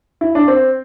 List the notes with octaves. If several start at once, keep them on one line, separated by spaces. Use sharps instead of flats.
E4
D4
C4